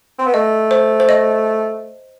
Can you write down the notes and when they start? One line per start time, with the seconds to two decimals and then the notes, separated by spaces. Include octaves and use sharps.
0.19 C4
0.26 B3
0.34 A3 D#5
0.71 C5
1.00 C5
1.09 D#5